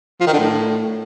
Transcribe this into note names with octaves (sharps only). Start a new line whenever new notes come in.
F3
D#3
D3
A2